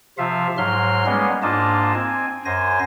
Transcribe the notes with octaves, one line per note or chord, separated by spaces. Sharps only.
C3 F3 F4 E5 F5
G#2 F#3 C6 F6
G3 G#3 A#3 B3 C#4
G#2 A#3 D4 F4 D#5 A5
C4 G#5
F#2 C5 G#5 A#6